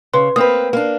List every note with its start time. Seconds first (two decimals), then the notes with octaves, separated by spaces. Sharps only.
0.14 C#3 B4 C6
0.36 A#3 C4 B4 D#6
0.73 A#3 D4